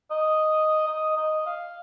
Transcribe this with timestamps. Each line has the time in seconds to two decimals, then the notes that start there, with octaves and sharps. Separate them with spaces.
0.11 D#5
0.87 D#5
1.17 D#5
1.46 F5